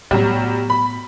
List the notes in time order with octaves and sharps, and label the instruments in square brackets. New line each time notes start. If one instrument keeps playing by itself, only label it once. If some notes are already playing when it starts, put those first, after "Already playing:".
[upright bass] A2 B3 [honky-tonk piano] F#3 G3
[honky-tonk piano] B5